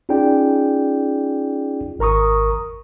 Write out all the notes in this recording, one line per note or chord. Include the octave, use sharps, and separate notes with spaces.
C#4 D#4 F4 G#4 D5 G5
G#1 A#4 A#5 C#6 D#6